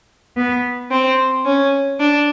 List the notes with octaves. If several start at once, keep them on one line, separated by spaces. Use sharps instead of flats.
B3
C4
C#4
D4